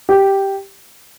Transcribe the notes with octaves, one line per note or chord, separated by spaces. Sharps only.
G4